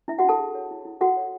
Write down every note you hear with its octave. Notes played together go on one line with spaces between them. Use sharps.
D4 E4 E5
F#4 F#5
D4 A4 A5
G#4
C#5
E4
E4
F#4 A4 F#5
C#5